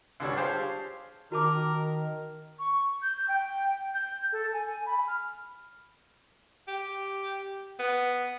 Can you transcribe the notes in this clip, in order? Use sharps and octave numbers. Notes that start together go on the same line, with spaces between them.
C#2 D3 G3 D4 C#5
G4 G#4 C5 C#5 F5 A5
D#3 F#4 A#4 A5 D6
C#6
G6
G5
G6
A4
G#5
B5
F6
G4
B3